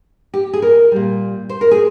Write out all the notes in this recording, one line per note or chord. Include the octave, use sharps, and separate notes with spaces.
G4
G#4
A#4
A#2 G3
C5
A#4
G#4